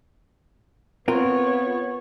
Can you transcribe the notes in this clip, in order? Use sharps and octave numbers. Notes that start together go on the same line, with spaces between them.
B3 C4 F4 A#4 C#5